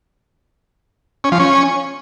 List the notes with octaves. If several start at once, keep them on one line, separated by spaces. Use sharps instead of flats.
C#4
F3
C#4